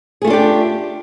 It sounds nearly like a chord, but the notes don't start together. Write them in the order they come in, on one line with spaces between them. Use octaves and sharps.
G#4 A3 F4 D4 G4